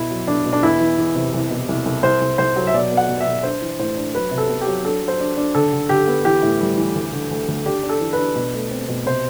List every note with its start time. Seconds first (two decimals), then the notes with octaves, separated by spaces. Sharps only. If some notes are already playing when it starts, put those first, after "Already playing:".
Already playing: B2 E4
0.10 F#3
0.27 B2 D4
0.46 B2
0.53 D4
0.62 E2 E4
0.80 E3
0.98 E2
1.16 C3
1.34 C2
1.50 B2
1.69 C2
1.86 C2
2.03 C2 C5
2.22 C2
2.38 C2 C5
2.56 F#3
2.67 E5
2.74 B2 D5
2.91 B3
2.97 F#5
3.09 B2
3.20 E5
3.26 B2
3.43 D4 C5
3.62 E3
3.79 A2 C5
3.97 D4
4.14 F#3 B4
4.31 C3
4.38 A4
4.49 B3
4.61 G4
4.67 F#3
4.85 D4 A4
5.02 F#3
5.08 C5
5.20 D4
5.37 D4
5.55 D3 A4
5.73 D3
5.89 D3 G4
6.07 B3
6.25 E3 G4
6.43 A2
6.61 G3
6.78 E3
6.95 D2
7.13 D3
7.31 D2
7.48 D2
7.66 D4 G4
7.83 D4
7.89 A4
8.01 E3
8.13 B4
8.18 D4
8.36 B2
8.53 A3
8.71 C4
8.88 B2
9.06 C3 C5